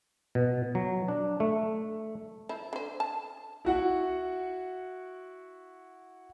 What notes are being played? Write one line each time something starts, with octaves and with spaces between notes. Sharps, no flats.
B2
F#3
D4
A3
F3 E4
D3 C5
A5
E4 F#4 F#5